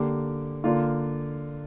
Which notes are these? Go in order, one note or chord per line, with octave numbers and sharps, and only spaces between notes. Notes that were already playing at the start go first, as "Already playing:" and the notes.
Already playing: D3 A#3 G4
D3 A#3 F4